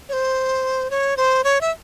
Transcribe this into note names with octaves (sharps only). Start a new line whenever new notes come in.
C#5
C5
C#5
C5
C#5
E5